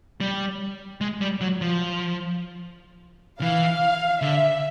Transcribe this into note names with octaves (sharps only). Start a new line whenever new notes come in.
G3
G#3
G3
F#3
F3
E3 F5
D3 E5